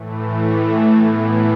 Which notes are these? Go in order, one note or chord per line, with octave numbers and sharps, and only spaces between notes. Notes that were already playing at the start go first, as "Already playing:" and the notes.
Already playing: A2 E3 A3
A2 E3 B3